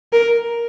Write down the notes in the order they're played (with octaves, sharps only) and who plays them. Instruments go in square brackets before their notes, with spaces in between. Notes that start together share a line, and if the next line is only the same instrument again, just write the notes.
[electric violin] A#4